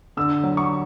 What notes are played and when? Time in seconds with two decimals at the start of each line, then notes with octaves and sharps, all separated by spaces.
0.17 D3 E6
0.43 F#3
0.57 C#6